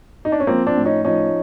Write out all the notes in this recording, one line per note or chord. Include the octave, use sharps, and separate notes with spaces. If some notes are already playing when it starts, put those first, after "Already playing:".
D#4
D4
C#4
F3 A#3 C4
C4 D4
A2
C#4 D#4
F3 C#4 D#4